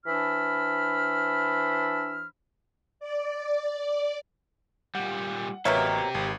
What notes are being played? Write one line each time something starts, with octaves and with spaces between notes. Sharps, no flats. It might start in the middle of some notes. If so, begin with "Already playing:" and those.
E3 D4 C5 B5 E6 F6
D5
A#2 G3 F#5
A1 B2 F#3 A#3 G4 C5 C#5 E5
G#1